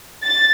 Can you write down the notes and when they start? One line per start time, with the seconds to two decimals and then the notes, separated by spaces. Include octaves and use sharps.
0.24 A6